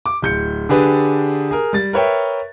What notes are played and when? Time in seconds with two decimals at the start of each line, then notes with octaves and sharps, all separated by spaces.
0.06 D6
0.22 D1 G6 C#7
0.69 D3 D4 G4 G#4 B4
1.51 G#4 A#4
1.73 G3 A6
1.93 A#4 B4 C#5 E5 G5